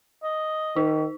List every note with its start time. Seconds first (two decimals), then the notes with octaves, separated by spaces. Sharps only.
0.23 D#5
0.76 D#3 D#4